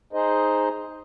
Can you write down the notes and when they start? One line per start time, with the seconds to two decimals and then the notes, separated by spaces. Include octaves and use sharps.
0.13 D#4 G#4 C5 D#5